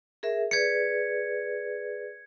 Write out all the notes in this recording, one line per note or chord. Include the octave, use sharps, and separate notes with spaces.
G#4 A#4 E5
G#4 B4 D5 G#6 C#7